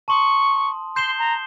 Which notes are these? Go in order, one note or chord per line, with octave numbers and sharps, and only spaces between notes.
A5 C6 C#6 D#6
C6 G6 C7 E7 G7
A#5